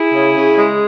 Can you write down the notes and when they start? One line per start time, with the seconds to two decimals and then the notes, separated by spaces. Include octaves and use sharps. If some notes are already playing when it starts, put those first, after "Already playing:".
Already playing: E4 G#4
0.15 C#3
0.37 C#3
0.58 G#3